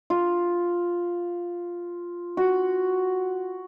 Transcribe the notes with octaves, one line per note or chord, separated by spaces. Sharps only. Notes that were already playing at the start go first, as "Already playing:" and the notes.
F4
F#4